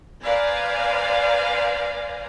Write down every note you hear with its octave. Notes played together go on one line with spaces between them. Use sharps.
B4 C5 D5 F5 G#5 A#5